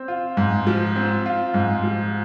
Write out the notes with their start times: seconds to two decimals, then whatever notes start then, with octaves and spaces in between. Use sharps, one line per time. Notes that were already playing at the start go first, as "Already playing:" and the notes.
Already playing: C4
0.08 F4
0.37 G#2
0.67 F3
0.96 C4
1.26 F4
1.54 G#2
1.83 F3